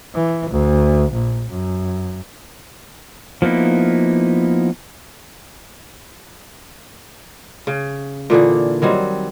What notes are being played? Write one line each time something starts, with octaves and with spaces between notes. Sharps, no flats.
E3
D2
A#1
F#2
F3 A#3 B3 D#4 E4
C#3
A#2 D3 E3 G#4
D#3 F#3 G3 C4